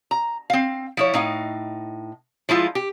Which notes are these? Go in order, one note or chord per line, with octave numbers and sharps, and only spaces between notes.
A#5
C4 F5
F3 E4 C#5
A2 D#4 F5
F3 G#3 E4 F4
G4